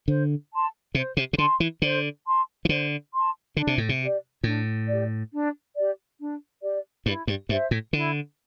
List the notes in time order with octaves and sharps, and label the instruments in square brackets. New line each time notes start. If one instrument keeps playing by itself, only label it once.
[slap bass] D3 [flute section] C5
[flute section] A5 C6
[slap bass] C3 [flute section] C5
[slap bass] C3
C3
[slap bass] D3 [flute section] A5 C6
[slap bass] E3
[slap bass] D3 [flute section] C5
[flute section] A5 C6
[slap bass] E3
[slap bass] D3 [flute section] C5
[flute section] A5 C6
[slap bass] D3 [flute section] D4
[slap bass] C3
A2
C3
[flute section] G4 D5
[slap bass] A2 [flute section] D4
[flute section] G4 D5
D4
G4 D5
D4
G4 D5
[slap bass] G2 [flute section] E4
[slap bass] G2
[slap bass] G2 [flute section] C5 E5
[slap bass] A2
[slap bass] D3 [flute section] E4